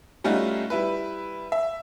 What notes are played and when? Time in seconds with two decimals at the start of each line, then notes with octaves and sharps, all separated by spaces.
0.24 G3 A3 C#4 D#4 F4 F#4
0.70 G3 E4 B4
1.52 E5